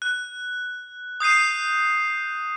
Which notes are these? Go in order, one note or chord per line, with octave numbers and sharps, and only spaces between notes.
F#6
D#6 G6 C7 D#7